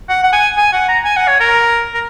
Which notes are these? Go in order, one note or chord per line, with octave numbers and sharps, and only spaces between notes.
F#5
F#5
G#5
G#5
F#5
A#5
G#5
F#5
C#5
A#4
A#4